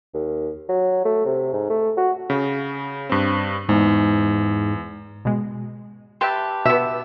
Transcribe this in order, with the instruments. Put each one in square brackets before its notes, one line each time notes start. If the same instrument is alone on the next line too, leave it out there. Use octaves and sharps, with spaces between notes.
[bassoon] D#2
F#3
A3
C3
G#2
A3
F#4
[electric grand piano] C#3
G2 C4
[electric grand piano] E2 [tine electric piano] G#2
[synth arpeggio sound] B2 G#3
[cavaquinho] G4 B4 A5 [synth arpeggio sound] E5 G5 C6
[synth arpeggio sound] B2 [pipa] B3 E5